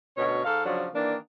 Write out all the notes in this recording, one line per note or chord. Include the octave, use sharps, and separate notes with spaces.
D2 B2 C#4 C#5
G#2 A4 F5
C#3 F3 F#3 D4
D#3 E3 A#3 D4